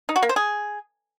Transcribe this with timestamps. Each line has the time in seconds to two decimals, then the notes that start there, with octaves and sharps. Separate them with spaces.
0.09 D#4
0.16 F#4
0.22 A#3
0.29 C5
0.36 G#4